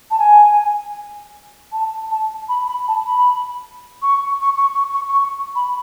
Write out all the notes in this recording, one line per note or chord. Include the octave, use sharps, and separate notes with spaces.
A5
G#5
A5
A5
B5
B5
A5
B5
C#6
C#6
C#6
C#6
C#6
C#6
B5